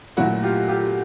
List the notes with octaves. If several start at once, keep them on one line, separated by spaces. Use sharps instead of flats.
A#2 F#3 A3 E4 F#4
F4 G4
F4 G4